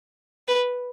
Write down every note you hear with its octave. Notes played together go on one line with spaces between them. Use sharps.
B4